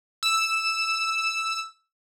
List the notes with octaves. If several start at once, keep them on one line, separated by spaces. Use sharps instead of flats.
E6 E7